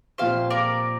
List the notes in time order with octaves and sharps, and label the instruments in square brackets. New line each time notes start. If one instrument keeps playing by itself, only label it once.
[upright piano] A#2 F3 C4 G4 [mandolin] C5 F5
[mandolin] A#4 D5